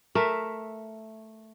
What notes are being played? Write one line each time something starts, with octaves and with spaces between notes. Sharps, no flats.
A3 A#4 E5